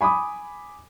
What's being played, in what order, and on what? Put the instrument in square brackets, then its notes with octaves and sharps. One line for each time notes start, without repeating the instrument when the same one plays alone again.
[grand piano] G#5 B5 D6 D#6